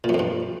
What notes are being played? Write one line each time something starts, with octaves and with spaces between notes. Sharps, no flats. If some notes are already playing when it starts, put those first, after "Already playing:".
A#2
F#2
F2
G2